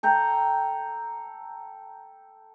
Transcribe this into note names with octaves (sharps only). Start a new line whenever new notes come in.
A4 G5 A#5